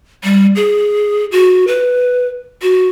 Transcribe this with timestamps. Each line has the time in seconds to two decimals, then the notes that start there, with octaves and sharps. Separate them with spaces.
0.24 G3
0.56 G#4
1.32 F#4
1.68 B4
2.62 F#4